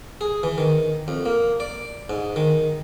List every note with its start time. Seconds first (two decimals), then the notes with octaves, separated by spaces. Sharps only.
0.21 G#4
0.43 E3
0.58 D#3
1.08 F2
1.25 A#3
1.60 D5
2.10 G#2
2.36 D#3